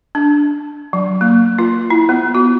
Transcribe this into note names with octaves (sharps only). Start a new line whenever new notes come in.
D4
F#3
A#3
F4
E4
B3
F#4